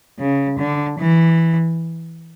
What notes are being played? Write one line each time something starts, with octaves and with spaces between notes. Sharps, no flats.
C#3
D3
E3